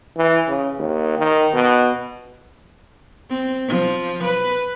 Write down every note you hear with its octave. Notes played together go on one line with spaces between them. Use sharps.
E3
C#3
D#2
D#3
B2
C4
F3
B4